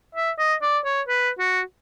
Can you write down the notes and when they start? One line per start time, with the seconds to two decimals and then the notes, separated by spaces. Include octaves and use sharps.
0.15 E5
0.38 D#5
0.62 D5
0.85 C#5
1.08 B4
1.39 F#4